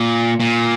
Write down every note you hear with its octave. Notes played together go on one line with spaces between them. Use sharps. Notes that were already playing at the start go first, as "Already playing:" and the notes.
Already playing: A#2
A#2